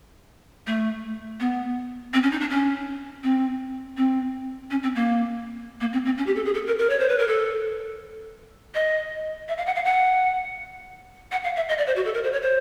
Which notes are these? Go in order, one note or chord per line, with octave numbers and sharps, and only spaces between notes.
A3
B3
C4
C#4
D#4
D4
C#4
C4
C4
C#4
C4
A#3
A#3
C4
C4
C#4
G4
A4
G#4
A4
A#4
A#4
C#5
C5
B4
A#4
A4
D#5
E5
F5
F#5
F5
F#5
F#5
F5
E5
D#5
D5
C5
F#4
A4
A#4
C5
C#5
C5